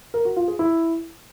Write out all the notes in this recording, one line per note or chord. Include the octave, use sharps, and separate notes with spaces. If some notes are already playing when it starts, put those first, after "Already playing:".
A#4
F#4
F4
G#4
E4